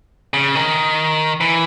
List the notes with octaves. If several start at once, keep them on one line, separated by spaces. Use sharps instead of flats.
C#3
D#3
E3